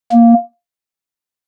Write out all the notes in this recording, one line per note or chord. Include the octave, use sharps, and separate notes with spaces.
A#3